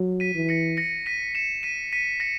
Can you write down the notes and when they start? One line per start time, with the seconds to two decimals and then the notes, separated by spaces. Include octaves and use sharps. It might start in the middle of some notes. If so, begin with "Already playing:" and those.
Already playing: F#3
0.20 B6 D#7
0.35 E3
0.49 A#6 C#7
0.77 A#6 C#7
1.06 B6 D#7
1.35 C#7 E7
1.63 B6 D#7
1.93 B6 D#7
2.20 A#6 C#7